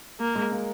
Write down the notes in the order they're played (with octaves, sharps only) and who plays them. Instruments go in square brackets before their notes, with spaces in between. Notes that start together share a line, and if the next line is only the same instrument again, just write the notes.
[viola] A#3
[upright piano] G#3
A#3